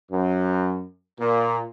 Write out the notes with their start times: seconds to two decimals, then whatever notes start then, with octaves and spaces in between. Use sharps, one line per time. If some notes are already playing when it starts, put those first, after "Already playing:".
0.10 F#2
1.20 A#2